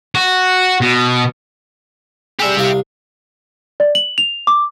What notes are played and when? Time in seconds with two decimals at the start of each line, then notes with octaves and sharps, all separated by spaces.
0.15 F#4
0.81 B2
2.39 G3 G4 G#4 E5
2.56 C2 F5
3.80 D5
3.95 F#7
4.18 F7
4.47 D6